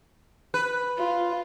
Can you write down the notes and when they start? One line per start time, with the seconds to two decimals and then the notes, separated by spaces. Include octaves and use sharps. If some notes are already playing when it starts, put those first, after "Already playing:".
0.54 B4
0.98 F4